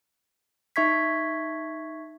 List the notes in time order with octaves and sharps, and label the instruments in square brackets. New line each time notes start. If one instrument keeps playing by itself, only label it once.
[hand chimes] D#4 E5 C#6 G#6 B6